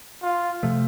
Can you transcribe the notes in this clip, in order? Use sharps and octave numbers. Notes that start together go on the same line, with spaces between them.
F4
C3 F3 A3